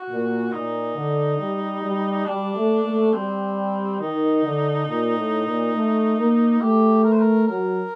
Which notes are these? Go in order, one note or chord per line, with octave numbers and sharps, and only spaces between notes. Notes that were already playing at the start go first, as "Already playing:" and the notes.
Already playing: F#4
A#2
A#2 D#4
D3
G3
G3
G3 D4
A3
A3
G3 C4
D#3 D#4
D3
A#2
A2
A#2
A3
A#3
A3 G4
A#4
C5
A#4
F#3 A#4